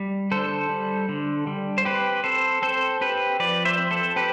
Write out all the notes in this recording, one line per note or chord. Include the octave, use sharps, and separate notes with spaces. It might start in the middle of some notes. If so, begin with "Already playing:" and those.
Already playing: G3
D3 A4 C5
G3
D3
G3
C5
C4 G4 B4
C4 A4 C5
C4 A4 C5
C4 G4 B4
F3 B4 D5
C5 E5
C4
A4 C5
C4 G4 B4